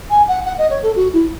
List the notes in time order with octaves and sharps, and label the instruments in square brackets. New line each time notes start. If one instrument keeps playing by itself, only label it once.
[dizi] G#5
F#5
F#5
D#5
C#5
A4
F#4
E4